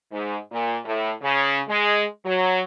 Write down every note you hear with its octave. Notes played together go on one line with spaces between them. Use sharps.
G#2
A#2
A2
C#3
G#3
F#3